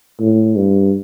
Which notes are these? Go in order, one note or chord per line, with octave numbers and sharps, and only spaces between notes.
A2
G2